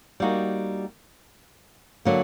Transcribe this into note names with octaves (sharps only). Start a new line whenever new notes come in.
G3 A#3 D#4 F#4
D3 F#3 A#3